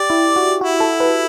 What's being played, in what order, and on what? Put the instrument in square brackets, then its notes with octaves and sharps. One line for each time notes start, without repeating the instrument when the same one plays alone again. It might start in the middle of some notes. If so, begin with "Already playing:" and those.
Already playing: [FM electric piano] G4 [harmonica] D5
[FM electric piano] E4
F#4
[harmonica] E4 [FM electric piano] F#4
[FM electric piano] A4
B4